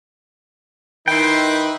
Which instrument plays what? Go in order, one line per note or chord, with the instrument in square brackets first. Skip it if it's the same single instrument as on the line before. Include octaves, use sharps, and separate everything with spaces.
[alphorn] D#3 [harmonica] D#4 E4 B4 [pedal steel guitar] G5 C6